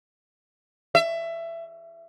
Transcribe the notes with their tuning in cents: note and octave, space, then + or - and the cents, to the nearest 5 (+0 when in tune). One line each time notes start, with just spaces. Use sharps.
E5 +20